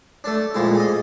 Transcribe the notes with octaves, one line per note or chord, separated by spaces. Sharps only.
A3 D4
F2 A#2 G#3 E4
G#4 D#5